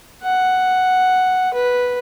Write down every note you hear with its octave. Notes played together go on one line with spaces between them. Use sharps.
F#5
B4